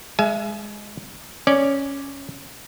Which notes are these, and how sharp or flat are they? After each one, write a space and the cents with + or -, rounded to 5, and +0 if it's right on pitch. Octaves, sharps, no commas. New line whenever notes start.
G#3 +0 E5 +35 G#5 +35
C#4 +0 D5 +0